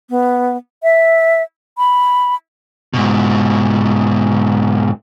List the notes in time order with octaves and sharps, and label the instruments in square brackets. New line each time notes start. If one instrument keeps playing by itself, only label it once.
[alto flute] B3
E5
B5
[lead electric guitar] G#2 B2